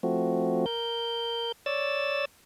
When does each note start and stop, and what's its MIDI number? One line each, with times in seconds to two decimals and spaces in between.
0.03 0.66 53
0.03 0.66 57
0.03 0.66 60
0.03 0.66 66
0.66 1.52 70
0.66 1.52 91
1.66 2.25 73
1.66 2.25 74
1.66 2.25 88
1.66 2.25 93